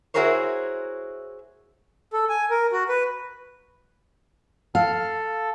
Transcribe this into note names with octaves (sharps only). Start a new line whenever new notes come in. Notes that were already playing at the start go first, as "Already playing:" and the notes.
E4 F#4 G#4 A#4 C5 C#5
A4
G#5
A#4
F#4
B4
A4 F5